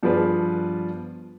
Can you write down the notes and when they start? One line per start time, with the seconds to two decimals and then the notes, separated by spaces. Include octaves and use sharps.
0.03 G2 F3 B3 G#4 B4 D5